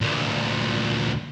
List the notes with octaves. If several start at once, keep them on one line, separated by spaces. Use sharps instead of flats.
D2 A#2